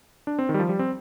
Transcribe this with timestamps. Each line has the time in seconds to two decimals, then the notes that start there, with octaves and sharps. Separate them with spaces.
0.27 D4
0.39 C4
0.49 D#3
0.54 G3
0.59 F3
0.69 G3
0.79 C4